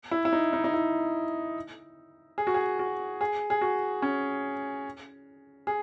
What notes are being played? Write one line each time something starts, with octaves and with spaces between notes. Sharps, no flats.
E4
E4
D#4
D#4
D#4
E4
G#4
F#4
G#4
F#4
G#4
G#4
F#4
C#4
G#4